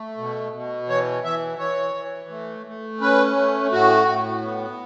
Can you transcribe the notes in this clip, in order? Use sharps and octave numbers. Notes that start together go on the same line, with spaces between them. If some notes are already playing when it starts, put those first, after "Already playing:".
Already playing: A3
B2
B2
E3 C#5
E3 E5
E3 C#5
E3
A3
A3
C#4 B4
A3
A2 F#4
A2
B3